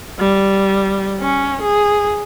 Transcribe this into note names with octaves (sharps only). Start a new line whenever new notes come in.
G3
C#4
G#4